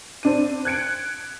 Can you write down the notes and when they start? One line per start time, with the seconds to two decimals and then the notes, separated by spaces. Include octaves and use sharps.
0.23 C4 D4 D#7
0.65 F#6 G#6 C#7 D7